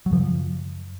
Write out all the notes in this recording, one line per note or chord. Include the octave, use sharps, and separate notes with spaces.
F#3
F#2 C#3 F3